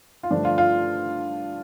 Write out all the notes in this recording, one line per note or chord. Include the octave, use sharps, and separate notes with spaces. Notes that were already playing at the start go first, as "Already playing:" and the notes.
F4
G2 D3 F3 A3 D4
F4
F4